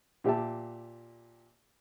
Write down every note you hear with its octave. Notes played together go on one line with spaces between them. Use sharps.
A#2 G4 E5 A5